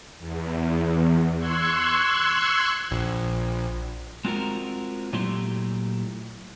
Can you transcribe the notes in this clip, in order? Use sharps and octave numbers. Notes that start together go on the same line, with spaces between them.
E2
C6 C#6 E6 F#6 G#6
A#1
G#3 C4 F4 F#4 A#4
A#2 F#3 A3 E4 G4 C6